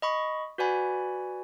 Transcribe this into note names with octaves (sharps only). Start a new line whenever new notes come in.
D#5 B5 C#6
F#4 B4 D5 F#5 G#5 B5